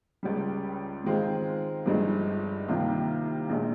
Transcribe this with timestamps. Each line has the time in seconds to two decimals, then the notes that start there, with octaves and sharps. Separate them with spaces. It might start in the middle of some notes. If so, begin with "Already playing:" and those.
0.23 C#2 C#3 G3
1.04 G#2 D#3 G#3 C4 F4
1.86 G1 G2 F3 G#3 D#4
2.68 C2 C3 D#3 A#3 F4
3.49 A#1 A#2 G#3